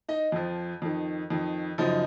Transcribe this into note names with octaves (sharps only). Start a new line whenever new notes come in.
D#4 D#5
F2 F3
F2 D#3
F2 D#3
F#2 C#3 F3 D#4